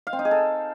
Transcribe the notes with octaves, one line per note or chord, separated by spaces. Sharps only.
F5
C4
D#4
G#4
A4